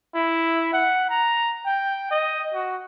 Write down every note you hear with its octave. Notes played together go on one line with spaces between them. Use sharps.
E4
F#5
A#5
G5
D#5
F#4